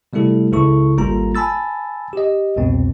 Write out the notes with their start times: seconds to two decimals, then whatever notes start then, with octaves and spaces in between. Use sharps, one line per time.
0.13 C3 G3 A3 E4 A4
0.52 C#2 C#3 E4 A4 C#6
0.98 G#1 G3 A#3 F4 A4 A#5
1.35 G#5 A5 B5 E6 A6
2.13 G4 D#5
2.56 C2 F2 B2 C4